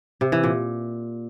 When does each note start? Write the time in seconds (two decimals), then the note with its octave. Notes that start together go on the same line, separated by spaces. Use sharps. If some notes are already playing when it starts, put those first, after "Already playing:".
0.21 C3
0.32 E3
0.43 A#2